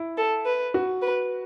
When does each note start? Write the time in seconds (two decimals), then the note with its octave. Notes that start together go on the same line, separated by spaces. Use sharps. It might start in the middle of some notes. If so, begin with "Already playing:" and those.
Already playing: E4
0.18 A4
0.45 B4
0.74 F#4
1.02 B4